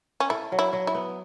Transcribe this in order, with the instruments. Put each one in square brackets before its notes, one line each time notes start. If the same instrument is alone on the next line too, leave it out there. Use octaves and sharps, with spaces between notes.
[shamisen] C#4
[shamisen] E4 [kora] A4
[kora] F#3
[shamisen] E4
[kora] F#3
[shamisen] E4
[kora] B3